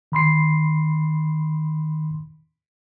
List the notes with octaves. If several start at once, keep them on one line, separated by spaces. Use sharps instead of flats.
D#3 B5 C6 C7